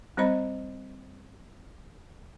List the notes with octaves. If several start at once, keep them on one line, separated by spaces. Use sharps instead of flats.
G3 C4 C5 D#5 B5